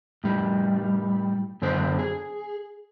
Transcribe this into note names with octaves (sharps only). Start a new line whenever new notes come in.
A2 G3
F#2 D3 B3 C5
G#4